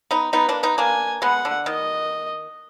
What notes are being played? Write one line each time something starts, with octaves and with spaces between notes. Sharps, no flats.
B3 D#4
B3 D#4 B4
A#3 D4
B3 D#4
A#3 D4 G#5
G#3 B3 F#5
D3
D#3 D#5